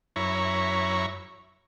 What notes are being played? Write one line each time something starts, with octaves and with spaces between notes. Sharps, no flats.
F#2 E4 C#5 A#5 B5 C#6